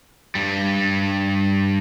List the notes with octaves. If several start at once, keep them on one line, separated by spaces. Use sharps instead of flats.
G2 G3